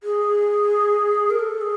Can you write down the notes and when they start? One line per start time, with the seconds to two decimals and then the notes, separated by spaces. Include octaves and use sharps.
0.03 G#4
1.30 A#4
1.39 A4
1.61 G#4